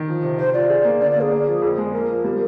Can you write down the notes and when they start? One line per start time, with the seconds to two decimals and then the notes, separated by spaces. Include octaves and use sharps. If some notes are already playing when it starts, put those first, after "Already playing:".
Already playing: D#3
0.08 F3
0.23 C3
0.38 C3 C5
0.54 F4 D5
0.69 G#4
0.85 A#3
1.01 D3 D5
1.11 D5
1.15 A#3
1.21 G#4
1.31 A#3
1.47 F3
1.62 F2
1.78 G#3
1.93 A#3 A#4
2.10 F3
2.24 G3